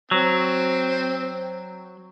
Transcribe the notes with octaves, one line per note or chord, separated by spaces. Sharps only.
F#3 C4